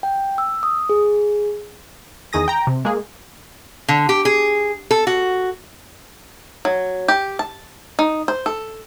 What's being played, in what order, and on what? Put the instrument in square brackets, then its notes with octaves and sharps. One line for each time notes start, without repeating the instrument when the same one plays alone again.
[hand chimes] G5
E6
D#6
G#4
[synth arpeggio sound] E2 D#3 G#4 D#6 A#6
G5 A#5
C3
G#3 A#3 G#4
[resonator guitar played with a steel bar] D3
G4
G#4
A4
F#4
[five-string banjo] F#3
G4
A5
D#4
C5
A4